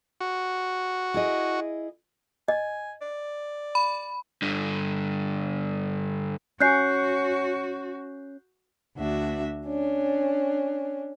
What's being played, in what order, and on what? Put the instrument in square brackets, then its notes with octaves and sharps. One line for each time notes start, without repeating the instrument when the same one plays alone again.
[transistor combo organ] F#4
[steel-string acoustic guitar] E4 G#4 D#5
[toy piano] D#5 [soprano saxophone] G#5
[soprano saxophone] D5
[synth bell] B5
[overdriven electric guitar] G2 D3
[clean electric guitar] C#4 [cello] F#4 [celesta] F#6 G6 C7
[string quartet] D2 D4 F#4 E5
C#4 D4